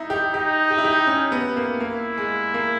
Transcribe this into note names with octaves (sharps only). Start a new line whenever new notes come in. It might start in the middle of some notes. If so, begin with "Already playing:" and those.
Already playing: D#4 E4
G4
D#4 G4
G4
E4
G4
C#4
B3
A#3
A#3 E4
G#3
A#3